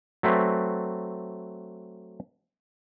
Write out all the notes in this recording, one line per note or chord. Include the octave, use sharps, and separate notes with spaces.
F#3 A3 C4 B4 D5